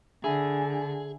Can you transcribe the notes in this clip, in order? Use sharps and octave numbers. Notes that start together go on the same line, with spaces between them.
D3 G#4 E5 G#5 B5